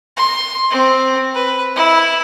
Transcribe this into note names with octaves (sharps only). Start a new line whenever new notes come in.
C6
C4
B4
E4